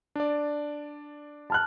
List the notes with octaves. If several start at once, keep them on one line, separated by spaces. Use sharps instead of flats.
D4 D5
A5 F6 F#6